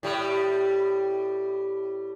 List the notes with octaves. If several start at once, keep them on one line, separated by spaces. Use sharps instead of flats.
A2 G3